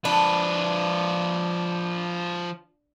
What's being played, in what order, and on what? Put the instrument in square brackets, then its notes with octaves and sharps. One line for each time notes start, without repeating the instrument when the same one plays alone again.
[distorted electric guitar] F3 B4 [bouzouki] D4